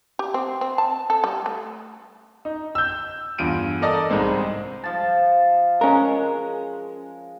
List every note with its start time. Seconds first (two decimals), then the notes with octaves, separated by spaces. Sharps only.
0.19 G4
0.34 C4
0.61 C4
0.78 A5
1.10 A4
1.24 G3
1.46 A3
2.45 D#4
2.75 E6 G6
3.38 E2 G2 F4 D7 D#7
3.82 A4 A#4 D5 D#5 A5 D#6
4.09 C2 G#2 G#3 C4
4.84 F3 A5
5.81 G#3 C#4 A#4